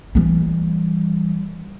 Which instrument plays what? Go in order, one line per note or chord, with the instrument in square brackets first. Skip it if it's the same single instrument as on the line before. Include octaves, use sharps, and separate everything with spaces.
[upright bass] E3 G3